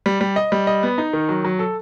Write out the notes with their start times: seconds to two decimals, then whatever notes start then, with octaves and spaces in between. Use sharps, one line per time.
0.06 G3
0.21 G3
0.36 D#5
0.52 G3
0.67 D#5
0.83 B3
0.98 D#4
1.13 D#3
1.29 F#3
1.44 F#3
1.59 A4